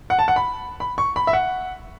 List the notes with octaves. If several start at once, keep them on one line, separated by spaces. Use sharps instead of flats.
F#5
A5
F#5
B5
B5
C#6
B5
E5
F#5